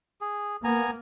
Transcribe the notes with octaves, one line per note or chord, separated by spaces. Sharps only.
G#4
A#3 B3 G#5 A#5